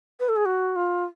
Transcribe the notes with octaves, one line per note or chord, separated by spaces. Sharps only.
B4
A4
G#4
F#4
F4